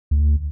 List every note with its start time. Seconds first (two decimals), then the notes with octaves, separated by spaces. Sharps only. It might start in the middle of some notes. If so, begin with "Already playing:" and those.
0.11 D2